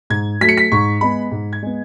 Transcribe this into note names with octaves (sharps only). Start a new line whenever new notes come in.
G#2 G#6
F#3 A3 B6
C#7
B6
G#2 C#6
G#3 B3 B5
G#2
G#6
G#3 B3